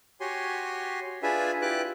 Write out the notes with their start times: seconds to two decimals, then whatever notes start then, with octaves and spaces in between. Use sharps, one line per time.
0.20 F#4 G4 C#5 G#5 C6
1.23 D4 F4 G#4 B4 E5 G#5
1.62 E4 F4 G4 B4 D6 F#6